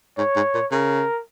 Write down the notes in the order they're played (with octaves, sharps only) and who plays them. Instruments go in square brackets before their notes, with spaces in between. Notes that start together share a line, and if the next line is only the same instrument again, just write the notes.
[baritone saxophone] G#2 [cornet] C#5
[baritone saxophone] G#2
A#2
[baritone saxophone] C#3 [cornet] A#4